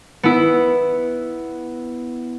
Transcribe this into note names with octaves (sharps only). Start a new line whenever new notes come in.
B3 E4